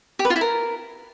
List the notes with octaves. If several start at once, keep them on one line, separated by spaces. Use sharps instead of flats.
G4
B4
F4
E4
A#4